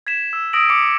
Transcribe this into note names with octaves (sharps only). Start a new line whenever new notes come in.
G#6 B6 E7
E6
D#6 E6 A#6 D7 F#7
D6 C#7